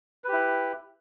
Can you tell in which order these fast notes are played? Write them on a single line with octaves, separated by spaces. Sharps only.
B4 G4 E4